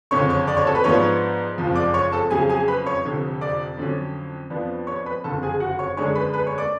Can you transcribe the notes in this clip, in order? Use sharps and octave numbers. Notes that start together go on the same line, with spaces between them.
F#1 F2 D3 C#5 C#6
C#5 C#6
D5 D6
C#5 C#6
A4 A5
B4 B5
G#2 F3 B3 D4 C#5 C#6
F#1 F2 F3
D5 D6
C#5 C#6
A4 A5
F2 C#3 F#3 G#4 G#5
G#4 G#5
B4 B5
C#5 C#6
F1 F2 D3
D5 D6
F2 D3 F#3 C#4
F2 F3 B3 D4
C#5 C#6
B4 B5
F#1 F2 D3 A4 A5
G#4 G#5
F#4 F#5
C#5 C#6
F#2 D3 G#3 D4 C#5 C#6
B4 B5
B4 B5
C#5 C#6
D5 D6